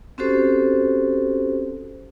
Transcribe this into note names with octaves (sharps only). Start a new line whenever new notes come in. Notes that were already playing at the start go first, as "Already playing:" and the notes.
C4 C#4 F#4 G4 A4 C5